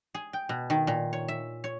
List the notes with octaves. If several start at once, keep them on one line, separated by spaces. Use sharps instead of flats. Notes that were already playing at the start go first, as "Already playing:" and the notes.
G#4
G5
B2
D#3
A#2
C#5
E5
C#5